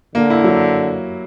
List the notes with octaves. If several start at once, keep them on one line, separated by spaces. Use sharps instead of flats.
D3 A#3
E4
F#3